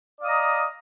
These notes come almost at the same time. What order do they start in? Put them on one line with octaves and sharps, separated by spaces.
D5 F5 D#6 D#5 A#5